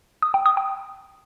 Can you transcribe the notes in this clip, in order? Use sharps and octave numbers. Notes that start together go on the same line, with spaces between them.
D#6
G5
D#6
G5